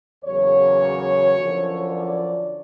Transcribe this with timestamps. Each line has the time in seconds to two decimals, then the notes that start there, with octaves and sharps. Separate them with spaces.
0.25 E2 C#3 F#3 A#3 C#5
1.36 F#2 D3 F3
1.91 D5